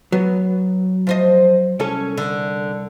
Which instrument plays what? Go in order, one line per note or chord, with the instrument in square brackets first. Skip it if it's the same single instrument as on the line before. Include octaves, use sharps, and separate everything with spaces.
[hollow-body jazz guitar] F#3 [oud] B3
[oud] F3 C5 D#5
[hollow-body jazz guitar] C2 A4 [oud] C#4
[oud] D3